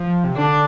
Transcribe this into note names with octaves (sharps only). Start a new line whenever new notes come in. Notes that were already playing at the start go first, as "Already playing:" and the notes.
Already playing: F3
C3
D3 D4